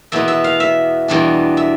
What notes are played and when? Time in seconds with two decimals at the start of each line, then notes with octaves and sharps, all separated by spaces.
0.12 E2 B2 B3 E5
0.28 E5
0.44 F5
0.60 E5
1.08 E2 B2 G3 D4
1.57 E5